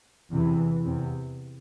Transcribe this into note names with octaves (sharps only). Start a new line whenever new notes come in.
E2 C3 E3
E2 C3